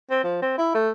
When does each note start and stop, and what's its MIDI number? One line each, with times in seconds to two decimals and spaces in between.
0.10 0.22 60
0.24 0.39 53
0.42 0.54 60
0.58 0.70 64
0.75 0.90 57